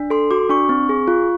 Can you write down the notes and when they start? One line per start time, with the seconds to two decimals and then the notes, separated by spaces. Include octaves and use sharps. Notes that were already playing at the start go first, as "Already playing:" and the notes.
Already playing: D4
0.10 A4 C6
0.31 F#4 D6
0.50 D4 C#6
0.69 C4
0.89 G#4
1.08 F4